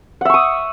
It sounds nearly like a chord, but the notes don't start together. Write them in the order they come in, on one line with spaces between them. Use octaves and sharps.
F#5 E5 C#6 D#6